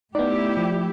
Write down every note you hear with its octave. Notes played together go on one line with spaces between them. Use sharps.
A3 B3 D#4 E4 G4 D5
F3